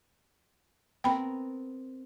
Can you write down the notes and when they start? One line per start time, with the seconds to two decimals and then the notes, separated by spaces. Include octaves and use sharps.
1.04 B3 C4 A#4 G5 B5